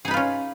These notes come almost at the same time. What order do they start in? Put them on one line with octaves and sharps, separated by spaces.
G#4 D#4 B4 F4 C#4